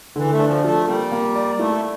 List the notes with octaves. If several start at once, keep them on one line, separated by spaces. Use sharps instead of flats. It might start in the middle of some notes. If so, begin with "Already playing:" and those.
D3 E3
A3
D4
F3
F3 A3
G3 A#3
A#3
D5
A3 E4